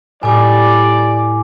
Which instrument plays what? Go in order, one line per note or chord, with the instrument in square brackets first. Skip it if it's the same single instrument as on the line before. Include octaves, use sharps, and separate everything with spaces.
[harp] A2 [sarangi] G3 [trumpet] D5 [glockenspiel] G#5 D6